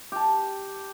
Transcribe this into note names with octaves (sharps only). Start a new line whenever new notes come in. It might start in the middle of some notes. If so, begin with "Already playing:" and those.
G4 A5